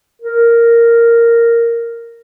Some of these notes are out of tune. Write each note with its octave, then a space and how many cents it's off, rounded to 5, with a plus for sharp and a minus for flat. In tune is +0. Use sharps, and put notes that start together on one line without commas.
A#4 -5